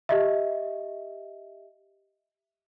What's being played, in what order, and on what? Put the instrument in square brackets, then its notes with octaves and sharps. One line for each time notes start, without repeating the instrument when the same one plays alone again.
[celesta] G4 D#5 E5